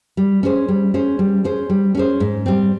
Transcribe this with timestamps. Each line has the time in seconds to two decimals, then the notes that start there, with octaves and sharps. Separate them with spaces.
0.17 G3
0.43 C#4 G#4 C5
0.68 G3
0.94 C#4 G#4 C5
1.19 G3
1.44 C#4 G#4 C5
1.70 G3
1.95 C#4 G#4 C5
2.20 G#2
2.46 G3 C4